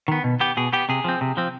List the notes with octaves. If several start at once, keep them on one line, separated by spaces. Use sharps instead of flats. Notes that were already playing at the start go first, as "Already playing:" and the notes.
D#3 B3
B2
B3 G4
B2 G#4
B3 G4
C3 G#4
F3 C4
C3
F3 C4